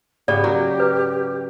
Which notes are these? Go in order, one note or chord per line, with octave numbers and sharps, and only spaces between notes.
G#2 C#3 B3 G4 D5
F#3 F#4 A#4
B4